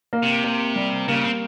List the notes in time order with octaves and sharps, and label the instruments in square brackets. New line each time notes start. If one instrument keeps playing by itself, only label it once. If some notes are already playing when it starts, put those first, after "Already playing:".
[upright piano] A#3
[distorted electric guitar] C3
[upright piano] A#3
G3
[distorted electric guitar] C#3 [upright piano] A#3
[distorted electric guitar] C4